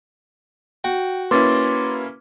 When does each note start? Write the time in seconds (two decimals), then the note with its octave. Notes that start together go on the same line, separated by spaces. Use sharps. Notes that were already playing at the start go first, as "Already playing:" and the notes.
0.84 F#4 G5
1.31 A#3 C#4 E4 B4 C6 D6 A6